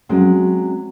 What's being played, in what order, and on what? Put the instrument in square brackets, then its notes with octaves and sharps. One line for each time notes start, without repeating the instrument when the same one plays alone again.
[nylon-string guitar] F#3 G#3 C4 C#4